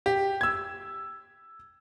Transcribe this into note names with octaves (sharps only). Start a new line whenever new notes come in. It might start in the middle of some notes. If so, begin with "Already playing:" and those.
G4
E6 G#6